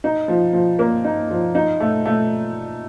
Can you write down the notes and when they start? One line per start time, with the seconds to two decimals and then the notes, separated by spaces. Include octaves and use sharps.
0.04 D#4
0.28 F3
0.53 F3
0.79 A#3
1.05 D#4
1.30 F3
1.55 D#4
1.80 A3
2.06 A3